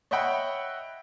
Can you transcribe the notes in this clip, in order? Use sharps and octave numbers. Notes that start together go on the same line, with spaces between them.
C#5 D#5 E5 F#5 G5 B5